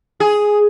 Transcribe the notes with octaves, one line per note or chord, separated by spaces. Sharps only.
G#4